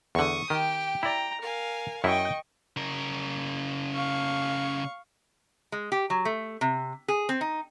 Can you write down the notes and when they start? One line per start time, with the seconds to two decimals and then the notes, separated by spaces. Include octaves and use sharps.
0.15 E2 D3 C#6 D#6
0.50 D#3 G4 G5
1.03 E4 D5 G5 A#5
1.42 A#4 F5 G#5
2.04 F#2 E4 D#5 G5 C#6
2.76 C#3 A#4
3.94 F5 C#6
5.72 G#3
5.92 G4
6.10 F#3
6.25 A3
6.61 C3
7.08 G#4
7.29 C4
7.41 D#4